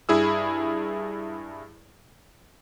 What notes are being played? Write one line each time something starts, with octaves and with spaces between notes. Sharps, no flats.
G2 E4 G#4 E6